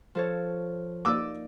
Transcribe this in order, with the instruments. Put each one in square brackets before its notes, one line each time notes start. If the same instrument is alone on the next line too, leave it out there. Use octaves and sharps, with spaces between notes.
[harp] F3 A4 C#5
[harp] A#3 D#4 D5 [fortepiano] D6 E6